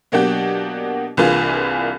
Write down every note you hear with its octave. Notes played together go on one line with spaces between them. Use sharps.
B2 F#3 A#3 D4 F#4 G4
C2 E3 A#3 D4 F4 G#4